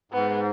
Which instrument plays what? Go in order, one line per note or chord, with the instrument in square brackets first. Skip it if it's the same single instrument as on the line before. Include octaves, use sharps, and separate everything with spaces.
[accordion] G#2 [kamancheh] B3